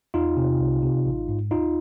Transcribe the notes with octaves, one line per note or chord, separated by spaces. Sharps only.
E2 D#4 F4
C3
C2
C3
A1
G#2
D#2 D#4 F4